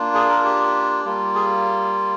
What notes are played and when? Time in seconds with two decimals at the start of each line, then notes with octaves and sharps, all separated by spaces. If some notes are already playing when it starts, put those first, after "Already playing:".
Already playing: A#3 D4 F4
0.14 G#4
0.29 A#4
0.44 G4
1.05 G3 A#3 F4
1.35 G#4